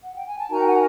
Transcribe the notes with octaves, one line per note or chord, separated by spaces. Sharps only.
F#5
G5
G#5
A5
D#4 F#4 A#4 G#5 A#5
G5
F#5 G#5